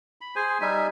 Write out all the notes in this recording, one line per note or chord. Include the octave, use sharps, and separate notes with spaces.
B5
G#4 C5 G#5
G3 D#4 E5 G#5